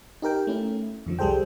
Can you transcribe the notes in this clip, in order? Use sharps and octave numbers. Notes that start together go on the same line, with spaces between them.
D#4 G4 A#4 G5
A3 C#4 E4
F2 D3 F3
C2 G3 G#4 A4 C5 G5